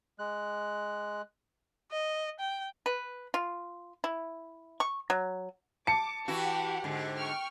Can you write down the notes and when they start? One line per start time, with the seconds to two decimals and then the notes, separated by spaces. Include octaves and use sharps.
0.19 G#3 F#6
1.92 D#5
2.40 G5
2.86 B4
3.34 F4
4.04 E4
4.80 C#6
5.10 F#3
5.87 A5 D6 C#7
6.28 E3 E4 F#4 G4 F#5
6.84 G#2 D3
7.18 G5 C#6 F6